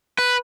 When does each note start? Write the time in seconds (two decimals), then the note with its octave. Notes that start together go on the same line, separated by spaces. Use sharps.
0.18 B4